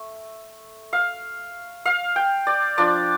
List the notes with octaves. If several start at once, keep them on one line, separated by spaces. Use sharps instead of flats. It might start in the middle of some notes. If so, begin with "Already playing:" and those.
Already playing: A3
F5
F5
G5
D5
F3 D4 F4 D5